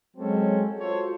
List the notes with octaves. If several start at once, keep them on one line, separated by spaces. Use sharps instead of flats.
F#3 G#3 C4 C#4 A4
F4 F#4 A4 C5 C#5